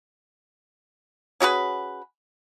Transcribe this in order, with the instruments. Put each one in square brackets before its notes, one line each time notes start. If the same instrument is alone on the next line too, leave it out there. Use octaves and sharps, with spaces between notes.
[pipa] C#4 F#4 G#4 B4